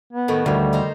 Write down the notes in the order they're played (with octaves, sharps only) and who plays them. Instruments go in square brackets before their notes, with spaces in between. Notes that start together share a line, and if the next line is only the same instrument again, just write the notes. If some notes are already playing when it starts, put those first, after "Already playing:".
[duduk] B3
[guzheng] A2 D#3 F#4
[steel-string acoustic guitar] D2 [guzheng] D#3 E3 [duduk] G3
[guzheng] D#4 C5 A#5